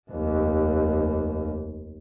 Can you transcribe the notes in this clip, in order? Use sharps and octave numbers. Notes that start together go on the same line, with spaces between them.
F1 D#2